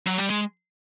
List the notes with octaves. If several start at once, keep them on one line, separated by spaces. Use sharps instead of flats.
F#3
G3
G#3